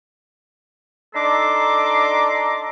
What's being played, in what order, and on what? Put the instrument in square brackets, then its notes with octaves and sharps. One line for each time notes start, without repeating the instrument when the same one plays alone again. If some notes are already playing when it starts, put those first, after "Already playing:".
[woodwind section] D4 D#4 A4 A#5 C6 D6